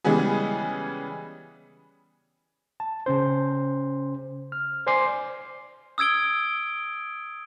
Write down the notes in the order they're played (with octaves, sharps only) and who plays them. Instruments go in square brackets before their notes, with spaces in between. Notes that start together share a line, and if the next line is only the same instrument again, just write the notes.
[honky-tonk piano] C#3 E3 G3 G#3 B3 G#4
[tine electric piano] A5
C#3 C#4 C5
F6
C5 D5 G#5 C6 D6 C7
[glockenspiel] D#6 E6 G#6 D7 G7